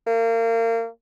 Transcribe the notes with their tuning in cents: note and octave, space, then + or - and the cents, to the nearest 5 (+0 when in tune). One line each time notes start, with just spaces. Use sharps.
A#3 -30